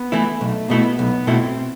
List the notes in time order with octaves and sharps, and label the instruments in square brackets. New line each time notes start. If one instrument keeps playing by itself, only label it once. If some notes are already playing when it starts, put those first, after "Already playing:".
Already playing: [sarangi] B3
[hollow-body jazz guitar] E3 A3 E4
[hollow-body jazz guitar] B1 [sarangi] A3
[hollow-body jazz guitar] B2 A3 E4 [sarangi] B3
[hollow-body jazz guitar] B1 [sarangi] B3
[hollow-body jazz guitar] B2 A3 E4 [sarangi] C4